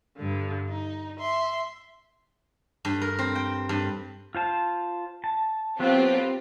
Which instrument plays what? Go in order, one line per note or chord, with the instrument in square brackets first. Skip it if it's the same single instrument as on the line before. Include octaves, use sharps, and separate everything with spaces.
[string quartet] G2 D3
D#4
E5 C6
[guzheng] G2
A#4
C4
G5
G2
[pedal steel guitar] F4 C5 A5
A5
[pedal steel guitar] F#3 B3 A4 [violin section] C4 F4 G4